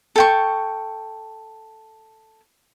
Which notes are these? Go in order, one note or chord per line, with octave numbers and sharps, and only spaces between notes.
A4 G5 C#6